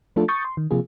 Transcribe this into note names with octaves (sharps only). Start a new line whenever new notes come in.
F3 A3 D4 F4 A4
C#6 D#6 G6 A6
C6
D#3
C3 F3 A#3 F4 G#4